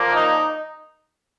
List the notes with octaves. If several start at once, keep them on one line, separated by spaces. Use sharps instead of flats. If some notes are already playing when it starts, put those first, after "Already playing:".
Already playing: A#2 F3 A#3
D#4